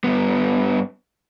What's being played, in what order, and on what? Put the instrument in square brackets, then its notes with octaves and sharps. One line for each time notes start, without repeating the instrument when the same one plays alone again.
[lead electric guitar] G2 B3